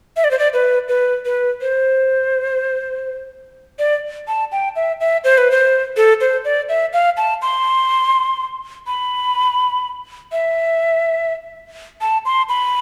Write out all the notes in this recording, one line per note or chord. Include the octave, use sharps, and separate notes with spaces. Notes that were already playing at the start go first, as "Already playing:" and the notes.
E5
D5
C5
D5
B4
B4
B4
C5
D5
A5
G5
E5
E5
C5
B4
C5
A4
C5
D5
E5
F5
A5
C6
B5
E5
A5
C6
B5